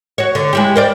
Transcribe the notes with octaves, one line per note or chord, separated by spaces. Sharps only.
F#4 C#5
D3
G#3 E4 G4
A#4 C5 D5